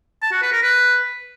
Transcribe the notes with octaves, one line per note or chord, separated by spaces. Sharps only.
A5
F#4
B4
A#4
B4